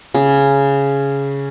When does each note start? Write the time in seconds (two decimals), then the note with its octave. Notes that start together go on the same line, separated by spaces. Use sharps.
0.14 C#3